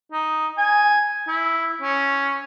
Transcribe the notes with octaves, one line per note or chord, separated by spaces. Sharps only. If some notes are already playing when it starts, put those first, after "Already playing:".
D#4
G#5
E4
C#4